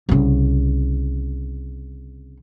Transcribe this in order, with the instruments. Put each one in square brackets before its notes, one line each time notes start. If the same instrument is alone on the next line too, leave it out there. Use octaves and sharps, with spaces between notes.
[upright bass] C2 C#3